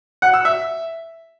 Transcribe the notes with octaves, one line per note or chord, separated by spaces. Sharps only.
F#5
E6
E5